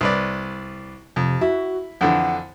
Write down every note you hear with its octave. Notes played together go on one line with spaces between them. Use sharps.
C2 B4 D5
F2 C3
E4 F#4
F2 D3 E3 F#5